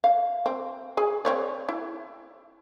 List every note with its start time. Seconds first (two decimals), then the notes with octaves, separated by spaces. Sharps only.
0.04 F5
0.46 C4
0.97 G#4 G#5
1.25 C4 C#5 D5
1.69 E4